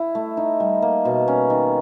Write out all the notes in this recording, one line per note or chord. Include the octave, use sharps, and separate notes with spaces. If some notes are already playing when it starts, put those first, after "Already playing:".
Already playing: E4
A3
D#4
G3
A#3
B2
C#4
D#3